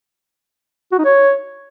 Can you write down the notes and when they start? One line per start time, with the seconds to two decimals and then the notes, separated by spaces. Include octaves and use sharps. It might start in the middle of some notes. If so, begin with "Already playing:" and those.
0.92 F#4
0.99 D#4
1.05 C#5